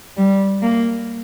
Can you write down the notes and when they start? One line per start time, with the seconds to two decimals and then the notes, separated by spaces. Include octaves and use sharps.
0.17 G3
0.62 A#3